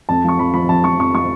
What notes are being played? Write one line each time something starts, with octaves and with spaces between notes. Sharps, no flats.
F2 A5
F3 C#6
F2 B5
F3 B5
F2 A5
F3 C#6
F2 C#6
F3 C#6